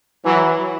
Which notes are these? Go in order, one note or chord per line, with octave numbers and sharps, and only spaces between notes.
E3 F#3